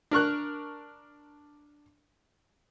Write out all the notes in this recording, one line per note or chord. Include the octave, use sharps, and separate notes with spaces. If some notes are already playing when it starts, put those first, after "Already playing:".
D4 A#4 C#6 F#6